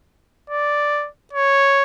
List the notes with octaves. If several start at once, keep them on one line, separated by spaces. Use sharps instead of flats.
D5
C#5